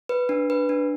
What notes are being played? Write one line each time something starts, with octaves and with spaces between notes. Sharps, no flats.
B4
D4
B4
D4